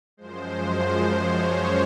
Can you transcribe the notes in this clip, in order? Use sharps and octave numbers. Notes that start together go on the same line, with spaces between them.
F#2 F3 G#3 C5
C#5